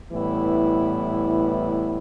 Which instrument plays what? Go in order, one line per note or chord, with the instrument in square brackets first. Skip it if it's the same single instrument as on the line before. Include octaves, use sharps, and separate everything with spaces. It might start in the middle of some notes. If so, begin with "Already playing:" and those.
[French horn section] A2 E3 G3 B3 E4